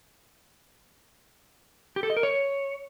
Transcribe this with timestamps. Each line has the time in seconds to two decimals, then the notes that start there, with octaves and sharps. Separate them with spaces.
1.96 G4
2.03 A4
2.10 D#5
2.16 A#4
2.23 C#5